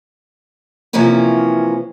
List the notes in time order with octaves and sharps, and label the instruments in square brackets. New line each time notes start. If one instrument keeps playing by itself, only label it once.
[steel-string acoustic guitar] C3 E3 F3 A#3 C#4